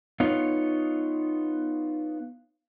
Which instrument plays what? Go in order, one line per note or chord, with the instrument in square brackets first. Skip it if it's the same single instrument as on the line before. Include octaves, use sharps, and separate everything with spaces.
[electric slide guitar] B3 D#4 F4 C#5